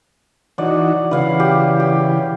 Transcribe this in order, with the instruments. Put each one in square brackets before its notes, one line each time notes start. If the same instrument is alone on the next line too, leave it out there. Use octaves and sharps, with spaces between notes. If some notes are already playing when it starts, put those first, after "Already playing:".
[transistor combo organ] E3 D#4 F#4 [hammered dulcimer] D5
[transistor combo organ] C#3 E3 [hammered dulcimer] B4 F5 F#5
[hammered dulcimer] G4
G4